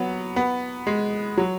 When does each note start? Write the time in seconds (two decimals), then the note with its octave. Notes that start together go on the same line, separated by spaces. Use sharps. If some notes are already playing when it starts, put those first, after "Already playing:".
Already playing: F#3 B3
0.36 B3
0.87 G#3
1.37 F#3